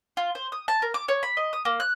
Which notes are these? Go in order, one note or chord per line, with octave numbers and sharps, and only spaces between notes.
F4
C5
D#6
A5
A#4
D6
C#5
B5
D#5
D#6
A#3
F#6